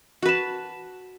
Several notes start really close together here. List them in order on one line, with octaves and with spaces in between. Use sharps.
F#4 B4 A5